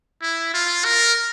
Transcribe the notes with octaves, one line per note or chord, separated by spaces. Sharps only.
E4
F4
A#4